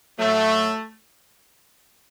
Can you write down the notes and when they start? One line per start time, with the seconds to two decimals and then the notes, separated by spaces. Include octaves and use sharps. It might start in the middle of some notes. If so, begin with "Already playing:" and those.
0.18 A2 F#3 A3